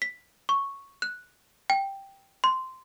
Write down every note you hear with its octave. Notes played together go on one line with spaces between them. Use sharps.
B6
C#6
F#6
G5
C6